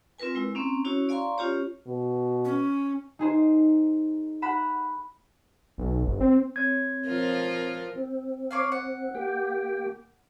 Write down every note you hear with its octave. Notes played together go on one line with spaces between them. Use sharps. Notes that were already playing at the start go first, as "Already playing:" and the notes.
C4 F4 A#4 B4 G#5
G#3 E4
A#3 C4 C#4
C#4 E4 F#4 C#5
D5 F5 G#5 A#5 C6 C#6
C#4 F4 G4 C#5
B2
C#4
D#4 G#4 C5
F#5 B5 E7
B1
G1
C4
C4 C#5 G#6
F3 F4 A#4
C4
C#5 D5 F5
F#5
A#3 G4 G5